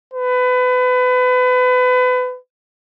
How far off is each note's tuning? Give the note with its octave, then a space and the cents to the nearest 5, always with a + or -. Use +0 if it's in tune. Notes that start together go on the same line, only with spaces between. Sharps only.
B4 +30